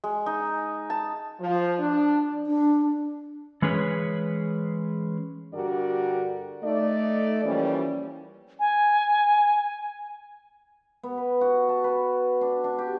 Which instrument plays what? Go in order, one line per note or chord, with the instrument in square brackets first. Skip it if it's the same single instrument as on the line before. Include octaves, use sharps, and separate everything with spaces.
[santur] G#3
D#4
A5
[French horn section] F3
D4
[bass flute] D4
[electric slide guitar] E3 G#3 C#4 G#4 B4 C#5
[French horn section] G2 D3 F#4 G4 A#4 D5
A3 D#4 D5
E3 F3 G3 A#3 C#4
[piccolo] G#5
[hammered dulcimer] B3
B4
F#4
A5
B4
D4
D4
G4